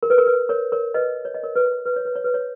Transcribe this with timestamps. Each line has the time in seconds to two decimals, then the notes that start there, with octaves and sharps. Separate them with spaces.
0.03 A#4
0.10 B4
0.18 A#4
0.26 B4
0.49 A#4 C#5
0.72 A#4 C#5
0.94 B4 D#5
1.25 C#5
1.34 D#5
1.43 A#4 C#5
1.55 B4
1.86 B4
1.96 C#5
2.05 B4
2.15 C#5
2.24 B4
2.34 C#5